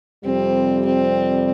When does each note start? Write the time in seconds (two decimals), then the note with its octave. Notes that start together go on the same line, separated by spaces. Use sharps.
0.24 F2 C3 G3 C4
0.85 C4